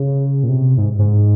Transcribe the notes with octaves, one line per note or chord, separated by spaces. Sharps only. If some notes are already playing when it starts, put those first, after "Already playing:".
Already playing: C#3
A#2
C3
G#2
G#2